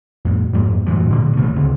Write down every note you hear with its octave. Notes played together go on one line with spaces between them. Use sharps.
F2 A2
F2 G#2 A3 A#3
F#2 A2 E3 F3
A#2 D3 D#3 A#3
A1 C3 E3 A3
C#2 D3 C4